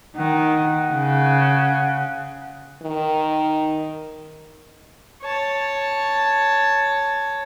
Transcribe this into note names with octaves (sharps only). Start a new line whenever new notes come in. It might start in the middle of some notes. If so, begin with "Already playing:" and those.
D#3 F#5
C#3
D#3
C#5 A5